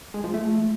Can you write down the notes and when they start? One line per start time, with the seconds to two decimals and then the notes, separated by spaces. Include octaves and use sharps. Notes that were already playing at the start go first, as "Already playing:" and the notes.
0.14 G#3
0.24 F3
0.34 A3